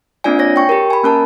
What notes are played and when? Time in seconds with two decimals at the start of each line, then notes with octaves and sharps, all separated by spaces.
0.24 A#3 C4 D4 F4 D5 G#5
0.39 C#5 A#6
0.56 G5 C#6
0.69 G4 A#4
0.90 G#5 B5
1.03 A#3 C#4 A#4 A5